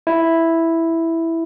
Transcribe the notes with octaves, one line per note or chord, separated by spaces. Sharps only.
E4